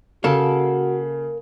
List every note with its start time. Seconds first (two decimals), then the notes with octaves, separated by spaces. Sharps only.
0.24 C#3 A#3 F#4 A4